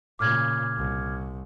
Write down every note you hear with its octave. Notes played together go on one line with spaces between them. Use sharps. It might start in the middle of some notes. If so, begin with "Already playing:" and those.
A#2 C#3 D6 F6 G#6
C2